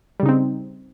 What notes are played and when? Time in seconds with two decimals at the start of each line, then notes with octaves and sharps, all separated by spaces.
0.20 G3
0.23 C#3
0.26 D#4
0.29 C4